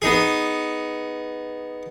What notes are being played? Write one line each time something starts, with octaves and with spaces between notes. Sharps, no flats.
B3 D#4 G#4